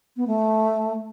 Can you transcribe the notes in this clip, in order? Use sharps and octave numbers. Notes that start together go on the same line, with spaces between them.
B3
A3